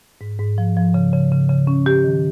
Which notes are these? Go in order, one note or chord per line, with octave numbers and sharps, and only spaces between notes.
G#2
G#2
F3
F3
C#3
C#3
C#3
C#3
C#4
G4
D#3